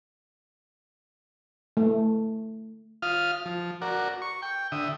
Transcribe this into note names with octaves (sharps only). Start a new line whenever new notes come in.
A3
F4 F5 D#6 F6
F3
F#4 A#4 D5
C#6
G5
D3 E5 D#6